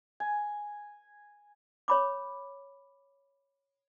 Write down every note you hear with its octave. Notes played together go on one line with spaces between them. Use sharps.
G#5
C#5 B5 D6